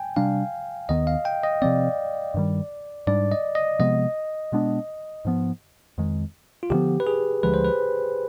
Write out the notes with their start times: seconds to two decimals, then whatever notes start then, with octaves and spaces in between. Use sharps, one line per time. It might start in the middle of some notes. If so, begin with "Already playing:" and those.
Already playing: G5 G#5
0.16 C3 G3 D4 F5
0.89 D#2 D#3 B3 D#5
1.07 F5
1.25 G5
1.44 D#5
1.62 C3 F3 C4 D5
2.34 G2 D#3 G3
3.07 G#2 G3 D4 D5
3.32 D#5
3.55 D#5
3.79 C3 F3 G#3 B3 D#5
4.52 B2 G#3 B3 D4
5.25 G#2 F3 B3
5.98 F2 D#3 G#3
6.63 F4
6.70 D2 D3 F3 B3 G4
7.00 B4
7.07 G#4
7.43 D2 D3 F3 G#3 B4
7.54 C5
7.64 B4